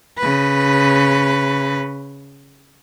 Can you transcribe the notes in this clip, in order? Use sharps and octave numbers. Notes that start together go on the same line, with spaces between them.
C#3 B4